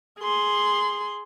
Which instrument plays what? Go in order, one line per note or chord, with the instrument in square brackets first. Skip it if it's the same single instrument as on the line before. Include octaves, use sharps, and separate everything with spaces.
[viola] G#4 C6